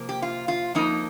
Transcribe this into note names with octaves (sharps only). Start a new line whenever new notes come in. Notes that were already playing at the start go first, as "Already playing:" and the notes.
Already playing: C3 F3 A#3
G4
F4
F4
F2 F3 A#3 D#4